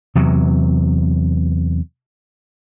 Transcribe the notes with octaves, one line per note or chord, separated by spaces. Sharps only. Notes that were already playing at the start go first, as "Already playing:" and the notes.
E2 C3 F#3